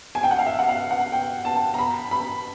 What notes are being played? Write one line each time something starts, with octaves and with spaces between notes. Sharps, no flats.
G#5
G5
F#5
F5
E5
F#5
F5
F#5
G5
A5
A#5
B5
B5